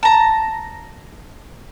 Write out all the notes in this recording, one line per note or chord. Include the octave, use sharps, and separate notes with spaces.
A5 A#5